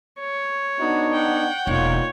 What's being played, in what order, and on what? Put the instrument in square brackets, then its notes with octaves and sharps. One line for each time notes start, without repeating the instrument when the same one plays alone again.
[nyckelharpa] C#5
[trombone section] B3 D4 D#4 [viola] F#4
[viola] F#5 G5
[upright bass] E1 [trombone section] A#2 D#4 F4 [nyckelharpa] C#5